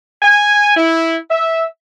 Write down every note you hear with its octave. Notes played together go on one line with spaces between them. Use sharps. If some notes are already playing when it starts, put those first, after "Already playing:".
G#5
E4
E5